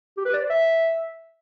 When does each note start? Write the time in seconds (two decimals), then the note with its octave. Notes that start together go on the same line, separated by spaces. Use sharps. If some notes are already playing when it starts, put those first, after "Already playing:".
0.17 G4
0.26 B4
0.34 D5
0.42 C5
0.50 E5